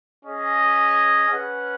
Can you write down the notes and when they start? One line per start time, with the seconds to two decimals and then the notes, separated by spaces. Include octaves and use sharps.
0.24 C#4 G#4 D#5
1.29 C#4 B4 F#5